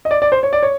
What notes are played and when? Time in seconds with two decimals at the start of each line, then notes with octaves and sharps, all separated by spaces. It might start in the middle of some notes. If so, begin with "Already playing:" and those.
0.05 D#5
0.11 D5
0.22 D5
0.32 C5
0.43 C#5
0.53 D5
0.63 C#5